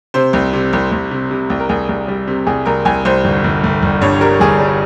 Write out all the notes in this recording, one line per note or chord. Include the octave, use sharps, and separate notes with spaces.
C3 C5
C2
C3
C2
C2
C3
C3
C2
A#4
C2 G#4
C2
G3
C3
C2 G#4
C2 A#4
C2 G#5
C2 C5
G1
G1
G1
G1
G2 C#5
G3 A#4
G1 G#4
G3